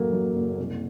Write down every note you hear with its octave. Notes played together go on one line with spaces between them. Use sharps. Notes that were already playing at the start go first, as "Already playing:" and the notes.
Already playing: A1 F#2 F#3 A3 A#3
F#3
F#1
C2